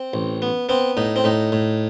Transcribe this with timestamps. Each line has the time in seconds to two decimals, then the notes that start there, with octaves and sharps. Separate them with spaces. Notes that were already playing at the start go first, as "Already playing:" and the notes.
Already playing: C4
0.14 A1
0.42 B3
0.69 B3 C4
0.97 A2 D#4
1.16 C4
1.24 A2 D#4
1.52 A2